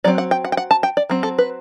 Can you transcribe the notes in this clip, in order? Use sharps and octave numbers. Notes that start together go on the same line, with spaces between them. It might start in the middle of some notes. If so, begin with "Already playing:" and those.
F#3 C4 D5
F#5
G5
F#5
G5
F#5
A5
G5
D5
F#3 C4
A4
B4